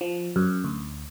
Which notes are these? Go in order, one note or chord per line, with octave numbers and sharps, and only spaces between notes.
F3
F#2
D2